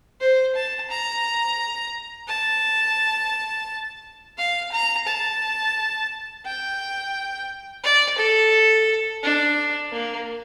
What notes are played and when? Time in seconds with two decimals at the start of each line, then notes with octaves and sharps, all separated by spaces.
0.21 C5
0.55 A5
0.90 A#5
2.28 A5
4.38 F5
4.72 A#5
5.06 A5
6.45 G5
7.84 D5
8.18 A4
9.23 D4
9.92 A#3